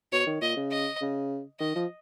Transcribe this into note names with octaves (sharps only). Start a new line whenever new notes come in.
B2 C#5
D#3
A#2 D#5
C#3
D#5
C#3
D#3 D#5
F3